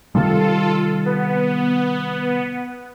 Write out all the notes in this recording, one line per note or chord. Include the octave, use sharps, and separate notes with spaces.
C3 D#3 G3 F4 A4
B3